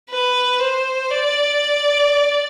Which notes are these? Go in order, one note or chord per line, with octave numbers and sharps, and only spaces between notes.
B4
C5
D5